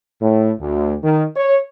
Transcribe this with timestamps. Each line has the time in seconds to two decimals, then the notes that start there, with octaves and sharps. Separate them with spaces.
0.21 A2
0.60 D2
1.03 D#3
1.36 C#5